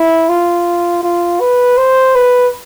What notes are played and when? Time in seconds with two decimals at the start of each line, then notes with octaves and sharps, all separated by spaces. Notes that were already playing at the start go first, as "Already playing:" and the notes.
Already playing: E4
0.29 F4
1.03 F4
1.40 B4
1.77 C5
2.15 B4